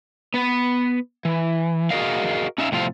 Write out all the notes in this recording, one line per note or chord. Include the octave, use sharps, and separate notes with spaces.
B3 B4
E3
F#4 G#4 A#4 D#5 F5
C#4 D#4 E5 F5
A2 C3 F3 C4 F5